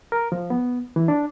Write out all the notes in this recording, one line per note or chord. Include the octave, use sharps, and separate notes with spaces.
A#4
F3
B3
E3
D4